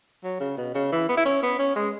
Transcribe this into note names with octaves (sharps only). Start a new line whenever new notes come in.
F#3
C#3
B2
C#3
E3
B3
E4
C#4
B3
C#4
G#3